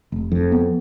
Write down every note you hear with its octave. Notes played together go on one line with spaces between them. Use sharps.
F1
F2
B3